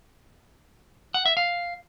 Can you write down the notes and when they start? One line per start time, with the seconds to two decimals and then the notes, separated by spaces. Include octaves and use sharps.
1.14 F#5
1.26 E5
1.37 F5